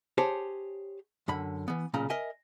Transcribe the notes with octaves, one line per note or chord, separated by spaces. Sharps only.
G4 G#4 C5 C#5 A5
F#2 D3 B5
E3 B3
B1 A#2 C#3 A#5
A#4 D#5 E5 G#5